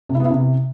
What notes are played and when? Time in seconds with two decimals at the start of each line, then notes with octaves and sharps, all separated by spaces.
0.09 C3
0.15 E4
0.20 B3
0.25 E4
0.30 C3